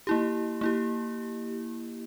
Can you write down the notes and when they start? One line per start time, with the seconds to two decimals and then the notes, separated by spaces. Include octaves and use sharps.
0.07 A#3 E4 G4
0.61 A#3 E4 G4